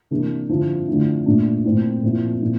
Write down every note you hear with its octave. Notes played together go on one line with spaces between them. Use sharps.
C3 E3 A#3 D4
D3 F3 C4 E4
D3 F3 A3 C4 E4
A#2 A3 D4
A#2 A3 C4 E4
A#2 F3 C4 E4
A#2 F3 C4 E4